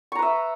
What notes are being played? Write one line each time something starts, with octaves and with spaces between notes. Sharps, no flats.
B4 E5 A#5 C#6